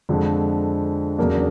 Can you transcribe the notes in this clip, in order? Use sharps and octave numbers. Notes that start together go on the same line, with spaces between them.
F2 D3 F3 G#3
E2 C#3 F#3 A#3 D4